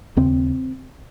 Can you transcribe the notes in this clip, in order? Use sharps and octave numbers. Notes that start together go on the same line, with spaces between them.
D#2 C#3 C4